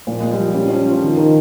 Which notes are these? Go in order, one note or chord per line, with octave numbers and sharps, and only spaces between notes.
A#2 F3
A#2 G#3
G3
F3
G3 C#4
F3 C#4
F4
F3
D#3
D#3